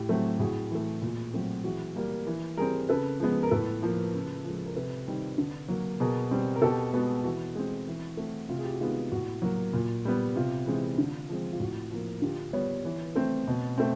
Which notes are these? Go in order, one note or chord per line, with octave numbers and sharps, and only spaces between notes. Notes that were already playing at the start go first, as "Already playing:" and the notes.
Already playing: A2 G4
F#3 A3 C4
A2 F#4 G#4
E3 A3
A#2
F#3 A3 C4
E3 F#4 G#4
G3 A#3
E3
G3 C4 G#4 A#4
C#3 A4 B4
F3 G#3 B3
A#4
A2 A4 B4
F3 A#3
C#3
F3 G#3
A#4
C3 A4 B4
D#3 G3 C4
D3
F#3 A#3
B2 G#4 A#4
G3 C4
A#4
B2 G4 A4
G#3 B3 F#4 G#4
E3 F#4
G#3 C4
E3
A3 C4
C3 F4
G#4
G4
F#4
D#3 G#3 B3 F4
A2 F#4
F#3 A#3
A#2
G3 B3
C3 F4
E3 G#3 C4
D3
F3 G#3 C4
F4
A2 F#4
F3 A#3
D3 F4 G4
G3 B3 B4 C#5
E3
A3 C4
B2
A3 C4